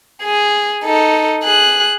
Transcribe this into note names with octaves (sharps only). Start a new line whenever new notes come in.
G#4
D#4 A4
G#4 F#6